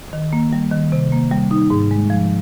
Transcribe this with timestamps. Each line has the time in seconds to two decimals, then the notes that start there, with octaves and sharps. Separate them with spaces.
0.13 D#3
0.33 A#3
0.53 G3
0.72 D#3
0.92 C3
1.12 A#3
1.31 G3
1.51 D#4
1.70 G#2
1.91 G#3
2.10 F3